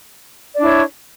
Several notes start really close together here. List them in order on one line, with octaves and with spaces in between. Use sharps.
D5 D4 E4 C#5